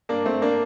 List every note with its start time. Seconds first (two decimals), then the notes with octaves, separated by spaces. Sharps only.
0.09 G2 A#3 D4
0.25 G2 A3 C4
0.42 A#3 D4